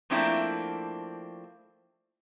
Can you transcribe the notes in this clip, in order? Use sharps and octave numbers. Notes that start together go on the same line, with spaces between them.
F3 A3 A#3 C4 D4 E4